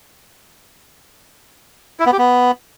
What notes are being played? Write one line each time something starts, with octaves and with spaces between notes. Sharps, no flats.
E4
B3
G4
B3